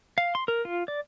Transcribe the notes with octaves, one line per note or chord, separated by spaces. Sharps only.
F5
C6
A#4
F4
D5